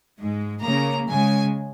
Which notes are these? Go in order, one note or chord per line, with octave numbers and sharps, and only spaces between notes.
G#2 G#3
C#3 A#3 A#5
C#3 G#3 G#5